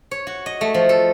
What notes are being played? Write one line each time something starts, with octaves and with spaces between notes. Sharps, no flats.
C#5
F#4
D#5
A3
F3
A4